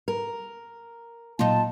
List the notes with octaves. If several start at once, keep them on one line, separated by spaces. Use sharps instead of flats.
A#4
A#2 F#3 A#3 D#4 F4 A5